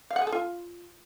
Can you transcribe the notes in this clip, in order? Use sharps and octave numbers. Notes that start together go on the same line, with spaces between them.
F5
F#5
G#4
A4
F4